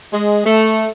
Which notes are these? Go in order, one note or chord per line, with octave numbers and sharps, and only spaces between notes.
G#3
A3